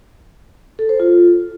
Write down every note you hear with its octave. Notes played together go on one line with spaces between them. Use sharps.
A4
C5
F4